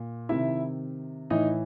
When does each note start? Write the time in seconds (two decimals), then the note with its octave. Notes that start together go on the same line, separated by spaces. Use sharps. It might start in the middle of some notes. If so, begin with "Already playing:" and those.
Already playing: A#2
0.29 C3 D#3 E4 E5
1.30 A2 E3 D#4 D#5